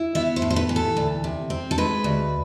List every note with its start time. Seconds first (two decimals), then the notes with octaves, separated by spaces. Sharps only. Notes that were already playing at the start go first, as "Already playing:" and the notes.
Already playing: E4
0.15 B3 E5
0.36 C5
0.42 A2
0.50 C5
0.56 B4
0.69 E3
0.76 A4
0.97 D2
1.24 C3
1.50 C4
1.71 A4
1.78 G#3 B4
2.04 D2